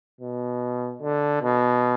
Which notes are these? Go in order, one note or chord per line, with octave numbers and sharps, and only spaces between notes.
B2
D3
B2